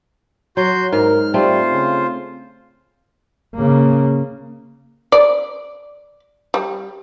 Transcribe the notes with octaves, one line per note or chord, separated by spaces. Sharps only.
F#3 F#4 C6 G6
G#2 A#4 F6
G3 A3 C4 F4 C5
C#3
C#3 A#3
D5
G3